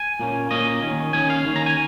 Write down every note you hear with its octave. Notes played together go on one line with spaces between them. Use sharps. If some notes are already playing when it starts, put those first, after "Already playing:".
Already playing: G#5
A#2 A#3 C#4
A#2 A#3 C#4 D#5
D#2 D#3 C#4
D#2 D#3 C#4 G#5
F5
D#2 D#3 C#4
A#5
G#5